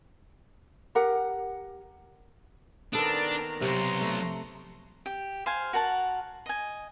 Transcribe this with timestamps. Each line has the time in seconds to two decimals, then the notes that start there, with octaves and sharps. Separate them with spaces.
0.95 G4 A#4 F#5
2.93 D#3 B3 C4 D4 A4 A#5
3.61 B1 C3 A#5 C6 C#6
4.01 A3
5.06 G4
5.46 C5 F5 G#5
5.73 F#4 A#4 F#5 A5
6.46 D#5 G#5